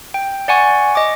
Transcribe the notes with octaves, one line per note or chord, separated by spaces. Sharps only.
G5
D5 F#5 G#5 C#6
D#5 D6